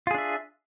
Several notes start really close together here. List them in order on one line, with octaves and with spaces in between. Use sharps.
F4 G#4 D4 E5